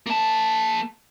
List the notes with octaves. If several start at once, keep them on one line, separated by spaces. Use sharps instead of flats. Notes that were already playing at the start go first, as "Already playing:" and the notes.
A#3 A5